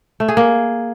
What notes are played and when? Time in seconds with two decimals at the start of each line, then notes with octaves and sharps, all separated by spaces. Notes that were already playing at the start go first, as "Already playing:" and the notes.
0.20 A3
0.28 G#4
0.37 A#3